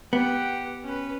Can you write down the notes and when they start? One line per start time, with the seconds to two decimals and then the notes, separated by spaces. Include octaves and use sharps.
0.13 B3 G4 F#5
0.84 C#4 B4